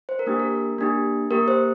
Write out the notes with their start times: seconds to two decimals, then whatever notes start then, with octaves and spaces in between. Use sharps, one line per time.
0.09 C5
0.19 A#4
0.26 A#3 D4 G4
0.39 A#4
0.78 A#3 D4 G4
1.31 A#3 G4 A#4
1.48 C5